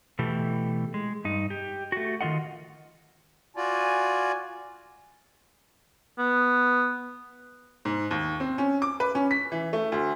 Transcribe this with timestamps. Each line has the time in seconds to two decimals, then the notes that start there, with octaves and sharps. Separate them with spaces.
0.19 B2 E3 A3 G4
0.94 G#3
1.25 G2 D#4
1.50 G4
1.92 A3 F#4
2.21 D#3 G#3 F4 D#5 F#5
3.57 F4 F#4 D5 G#5
6.18 B3
7.85 G#2
8.11 D#2
8.40 C4
8.58 C#4
8.82 D6
9.00 B4
9.15 C#4
9.31 B6
9.52 E3
9.73 A3
9.92 D2